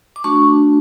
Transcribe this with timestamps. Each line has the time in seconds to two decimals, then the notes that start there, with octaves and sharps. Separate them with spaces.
0.16 D6
0.24 A3 D4 F#4 A5 C#6